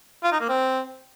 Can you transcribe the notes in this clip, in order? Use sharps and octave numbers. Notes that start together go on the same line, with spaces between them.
F4
D#4
A#3
C4